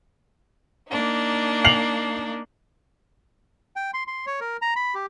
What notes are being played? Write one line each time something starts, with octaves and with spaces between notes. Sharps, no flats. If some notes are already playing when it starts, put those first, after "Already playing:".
A#3 D4 D#4
C7 F7 F#7
G5
C6
C6
C#5
A#4
A#5
B5
G4